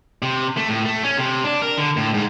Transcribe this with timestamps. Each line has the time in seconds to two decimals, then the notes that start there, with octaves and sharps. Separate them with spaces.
0.22 C3
0.57 A3
0.69 A2
0.85 A3
1.04 C#4
1.18 C3
1.44 D4
1.62 A#4
1.78 D3
1.97 A2
2.14 G#2